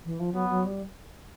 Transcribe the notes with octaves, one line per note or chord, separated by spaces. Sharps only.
E3
F3
F#3 B3
F#3
G3